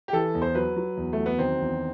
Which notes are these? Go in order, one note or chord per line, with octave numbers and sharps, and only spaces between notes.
G4
E3 A4
E2
C5
F#3 B4
F#3
E2
A3
F#3
B3
D#3 C4
E2